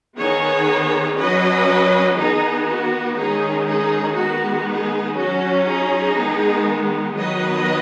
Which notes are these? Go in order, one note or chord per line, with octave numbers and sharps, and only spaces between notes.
D#3 B3 G#4 C#5
F#3 C#4 B4 D#5
D#3 B3 D#4 G#4
F#4
D#3 G#3 C#4 D#4 G#4
D#4 G#4
D#3 G#3 B3 F#4
D#4 G#4
F#3 C#4 F#4
D#4 G#4
D#3 G#3 B3
D#3 F#3 B3 B4 D#5